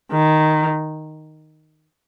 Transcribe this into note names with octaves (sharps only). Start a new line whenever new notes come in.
D#3